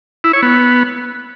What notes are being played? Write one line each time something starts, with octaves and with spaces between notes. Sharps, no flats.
E4
C#5
B3